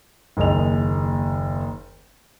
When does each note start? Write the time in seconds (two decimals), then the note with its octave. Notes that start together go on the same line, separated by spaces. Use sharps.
0.37 F#1 D#2 G#4 D#5 F7